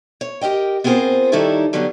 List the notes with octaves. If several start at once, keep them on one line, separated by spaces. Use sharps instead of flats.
C#5
G4 A#4 D#5 G5
B3 C4 F4 G#4 A#4 C5
D#3 G3 D#4 E4 A4 C#5
D3 F#3 G3 B3 D#4